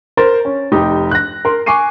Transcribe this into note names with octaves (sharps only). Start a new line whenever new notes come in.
A#4 C5 A6
C#4
F1 D#4 G4
F#6 A#6
A#4 C6
G#5 C#6 D6 C7 D#7